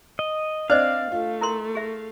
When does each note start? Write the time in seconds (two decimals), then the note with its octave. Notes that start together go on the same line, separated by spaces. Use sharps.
0.19 D#5
0.70 C4 D4 C5 D5 D#5 F5
1.12 A3 F4
1.41 E4 A#4 C6
1.75 G#4 E5